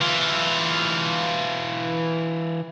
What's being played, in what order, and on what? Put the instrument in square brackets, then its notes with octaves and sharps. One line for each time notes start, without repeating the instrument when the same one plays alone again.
[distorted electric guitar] E3 F4